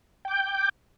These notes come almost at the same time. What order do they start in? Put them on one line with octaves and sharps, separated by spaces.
G5 D6 G6